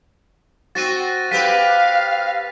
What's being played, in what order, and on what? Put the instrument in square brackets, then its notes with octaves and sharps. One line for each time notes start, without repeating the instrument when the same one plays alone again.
[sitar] C4 F#4 [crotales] A6 A#6 D#7
[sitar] C4 G4 B4 [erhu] F5 [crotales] B6 D#7